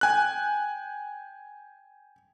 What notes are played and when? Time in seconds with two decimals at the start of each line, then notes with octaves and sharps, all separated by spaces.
0.01 G5 G#5 F#6